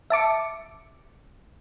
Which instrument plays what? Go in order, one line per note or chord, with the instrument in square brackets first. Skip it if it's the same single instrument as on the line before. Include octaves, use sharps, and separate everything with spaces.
[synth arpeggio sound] E5 A5 D6 C#7